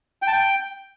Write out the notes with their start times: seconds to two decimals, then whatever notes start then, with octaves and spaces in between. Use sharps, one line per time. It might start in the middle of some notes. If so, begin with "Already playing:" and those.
0.22 G5
0.28 A5
0.33 G5